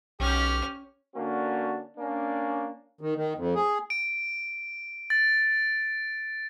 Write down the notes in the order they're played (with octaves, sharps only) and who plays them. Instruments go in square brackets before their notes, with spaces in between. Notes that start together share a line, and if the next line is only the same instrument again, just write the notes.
[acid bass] B1 [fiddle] C#4 F6 [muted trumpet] G4
[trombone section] D3 A#3 C#4 D4 F#4
A#3 C#4 D4
[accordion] D#3
D#3
F2
G#4
[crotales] D7
A6